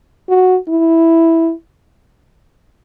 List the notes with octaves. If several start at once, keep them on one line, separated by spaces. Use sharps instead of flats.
F#4
E4